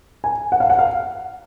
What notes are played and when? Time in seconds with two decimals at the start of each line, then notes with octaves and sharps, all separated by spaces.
0.24 G#5
0.52 F#5
0.60 F5
0.70 F#5
0.79 F5